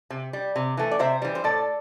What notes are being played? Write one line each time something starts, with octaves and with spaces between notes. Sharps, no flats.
C3
G3
C3
E3 A3
D5
C3 C5 E5
E3 G3
C5
A2 A4 D5